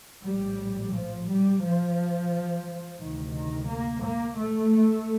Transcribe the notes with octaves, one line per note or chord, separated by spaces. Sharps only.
A#1 A2 G3
F3
G3
F3
D2 C3 D#3
D#3
A#3
A#3
A3